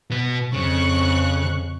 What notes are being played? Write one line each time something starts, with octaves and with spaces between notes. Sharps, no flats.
B2 B4
F2 C#3 C#6 F#6